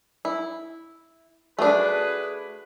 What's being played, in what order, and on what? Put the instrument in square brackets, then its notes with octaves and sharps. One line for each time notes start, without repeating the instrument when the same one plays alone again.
[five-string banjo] E4
[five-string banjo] A3 D4 [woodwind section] F#4 G#4 B4